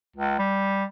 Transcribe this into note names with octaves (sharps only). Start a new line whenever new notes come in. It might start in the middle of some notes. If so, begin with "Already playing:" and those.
C#2
G3